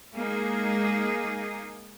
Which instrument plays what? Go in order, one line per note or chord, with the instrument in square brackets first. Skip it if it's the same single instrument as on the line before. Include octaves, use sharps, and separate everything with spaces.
[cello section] G#3 A#3 D#4 G#4